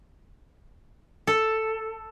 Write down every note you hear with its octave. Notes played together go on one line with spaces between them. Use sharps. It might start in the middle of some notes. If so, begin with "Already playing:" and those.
A4